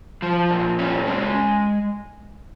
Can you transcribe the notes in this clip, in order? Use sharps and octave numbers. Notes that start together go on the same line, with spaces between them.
F3
A#2
C#4
G#3